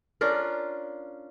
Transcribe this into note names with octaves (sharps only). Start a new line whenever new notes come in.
C#4 D4 F4 A#4